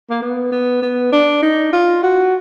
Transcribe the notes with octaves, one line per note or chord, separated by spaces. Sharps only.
A#3
B3
B3
B3
D4
D#4
F4
F#4